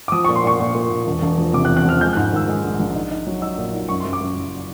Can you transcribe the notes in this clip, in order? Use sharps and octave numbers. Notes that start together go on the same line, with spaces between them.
D6
F3 D#6
C#6
A#2
C6
A#2 C#6
A#2
A#2
A#2
E1
E1
F3
C3 D6
F#6
E2
F#6
F3 F6
G#3 G6
F#6
G#2
F#6
D#3 E6
G#3
A#1
A#1
D#4
D#4
F#3
D#4 E6
A#2
D#4
F#2 C#6
C6
F#2
D6
F#2
F#1